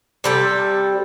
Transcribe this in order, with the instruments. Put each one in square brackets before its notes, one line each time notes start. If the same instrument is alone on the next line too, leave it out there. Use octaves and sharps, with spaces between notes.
[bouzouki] C3 G3 A4